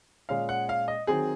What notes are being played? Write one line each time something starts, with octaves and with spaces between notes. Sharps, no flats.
A#2 G#3 C#4 F5
F#5
F5
D#5
D#3 F#3 C4 G#4